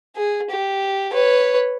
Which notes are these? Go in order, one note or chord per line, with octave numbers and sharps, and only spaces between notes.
G#4
G4
B4 C#5